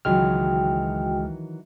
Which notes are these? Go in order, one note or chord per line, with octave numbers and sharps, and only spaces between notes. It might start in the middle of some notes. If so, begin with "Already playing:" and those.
C#2 D#3 E3 F#3 G#3 F#4 G5 F6